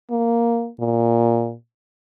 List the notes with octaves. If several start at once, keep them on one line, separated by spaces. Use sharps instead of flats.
A#3
A#2